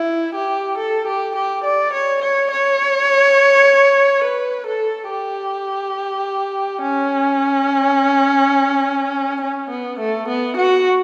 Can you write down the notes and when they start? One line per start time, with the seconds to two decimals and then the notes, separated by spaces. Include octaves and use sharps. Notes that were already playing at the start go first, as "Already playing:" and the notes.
Already playing: E4
0.35 G4
0.78 A4
1.07 G4
1.36 G4
1.64 D5
1.93 C#5
2.22 C#5
2.51 C#5
4.24 B4
4.67 A4
5.10 G4
6.82 C#4
9.42 C#4
9.70 B3
9.99 A3
10.28 B3
10.57 F#4